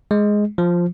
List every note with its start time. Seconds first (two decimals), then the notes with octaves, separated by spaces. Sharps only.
0.11 G#3
0.58 F3